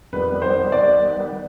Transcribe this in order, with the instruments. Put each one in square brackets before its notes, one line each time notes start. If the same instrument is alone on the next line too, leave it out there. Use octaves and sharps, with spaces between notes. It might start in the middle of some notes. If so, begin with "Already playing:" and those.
[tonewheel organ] F2 D#3 G3 B3 [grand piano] B4
[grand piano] C5
[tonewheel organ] D#3 G3 B3 [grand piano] D5